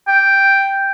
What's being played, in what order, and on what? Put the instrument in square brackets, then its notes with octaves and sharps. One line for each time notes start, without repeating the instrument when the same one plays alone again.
[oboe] G5